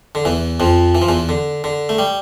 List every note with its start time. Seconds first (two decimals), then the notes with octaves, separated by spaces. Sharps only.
0.15 D3
0.25 E2 E3
0.60 F2 F3
0.95 E3
1.02 F3
1.09 E2 E3
1.29 D3
1.64 D3
1.89 A3
1.99 G3